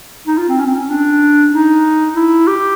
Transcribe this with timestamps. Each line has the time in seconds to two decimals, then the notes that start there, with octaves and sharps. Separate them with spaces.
0.27 D#4
0.38 F4
0.49 C4
0.60 C#4
0.67 C4
0.74 C#4
0.90 D4
1.53 D#4
2.16 E4
2.47 G4